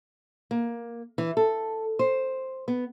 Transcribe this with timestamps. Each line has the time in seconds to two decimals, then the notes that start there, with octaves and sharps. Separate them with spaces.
0.51 A#3
1.18 E3
1.37 A4
1.99 C5
2.68 B3